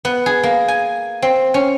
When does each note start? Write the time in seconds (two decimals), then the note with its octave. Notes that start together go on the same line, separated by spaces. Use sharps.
0.05 B3
0.26 G#4
0.43 A#3
0.68 G#5
1.22 C4
1.54 C#4